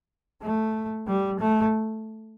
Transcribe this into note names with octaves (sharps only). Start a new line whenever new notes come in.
A3
G3
A3